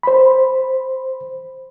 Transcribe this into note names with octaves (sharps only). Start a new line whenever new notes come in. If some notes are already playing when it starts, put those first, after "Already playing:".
C5 B5